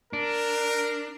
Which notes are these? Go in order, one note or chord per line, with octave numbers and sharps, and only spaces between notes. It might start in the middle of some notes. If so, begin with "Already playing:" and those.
D4 A#4